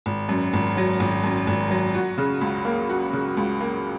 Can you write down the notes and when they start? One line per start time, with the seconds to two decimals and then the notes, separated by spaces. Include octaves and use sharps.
0.06 G#1
0.29 F#2
0.54 G#1
0.77 F#3
1.00 G#1
1.24 F#2
1.47 G#1
1.71 F#3
1.95 F#4
2.18 C#3
2.41 C#2
2.65 A#3
2.90 F#4
3.13 C#3
3.37 C#2
3.60 A#3